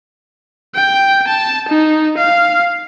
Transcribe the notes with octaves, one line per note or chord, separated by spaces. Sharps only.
G5
A5
D#4
F5